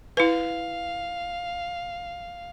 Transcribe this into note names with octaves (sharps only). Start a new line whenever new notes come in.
E4 B4 F5